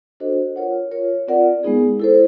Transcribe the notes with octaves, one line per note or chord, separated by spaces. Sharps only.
D4 F#4 A4 C5 D#5
F4 A#4 C#5 F#5
F4 A#4 C#5
C4 F4 A#4 D5 F#5
G#3 B3 D#4 G#4
E4 A4 C5